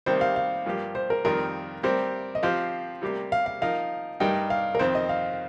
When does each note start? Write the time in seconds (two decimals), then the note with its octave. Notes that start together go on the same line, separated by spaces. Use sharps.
0.06 C3 D#3 G3 A#3 C5
0.21 F5
0.36 F5
0.66 G2 F3 A#3 G4
0.95 C5
1.10 A#4
1.25 F2 D#3 G3 C4 F4 A#4
1.83 G3 C4 G4 A#4 C5
2.35 D#5
2.43 F3 C4 G4 C5 F5
3.02 C3 G3 A#3 G4
3.32 F5
3.46 F5
3.61 F3 D#4 A#4 F5
4.20 G2 G3 D#4 A#4 G5
4.50 F5
4.75 A#4
4.79 F2 D#3 C4 C5
4.95 D#5
5.09 F5